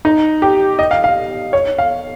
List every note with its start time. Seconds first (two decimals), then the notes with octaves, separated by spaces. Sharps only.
0.05 D#4
0.42 G4
0.79 D#5
0.91 F5
1.04 F5
1.53 C#5
1.78 F5